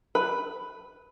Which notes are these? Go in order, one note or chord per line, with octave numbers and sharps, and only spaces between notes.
B4